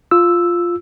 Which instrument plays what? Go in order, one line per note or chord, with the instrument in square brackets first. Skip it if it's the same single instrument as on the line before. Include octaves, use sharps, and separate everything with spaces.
[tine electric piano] F4 E6